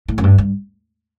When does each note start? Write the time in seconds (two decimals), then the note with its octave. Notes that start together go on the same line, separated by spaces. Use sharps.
0.08 A2
0.18 F#2
0.23 G2
0.38 G2